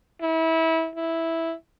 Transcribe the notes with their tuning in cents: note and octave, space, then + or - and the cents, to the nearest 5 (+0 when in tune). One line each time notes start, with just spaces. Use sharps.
E4 -25
E4 -5